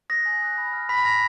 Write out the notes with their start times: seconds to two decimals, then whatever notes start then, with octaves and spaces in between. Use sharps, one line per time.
0.10 D#6 F#6 A#6
0.26 G#5
0.42 D#6 F#6
0.58 B5
0.73 F6
0.89 B5 B6
1.05 F6 A#6